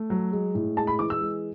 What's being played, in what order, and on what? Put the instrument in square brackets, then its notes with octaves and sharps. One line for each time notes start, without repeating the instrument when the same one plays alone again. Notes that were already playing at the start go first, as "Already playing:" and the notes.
Already playing: [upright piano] A3
F#3
G#3
A2
G#3 A5
B5
E3 D6
E6
G#3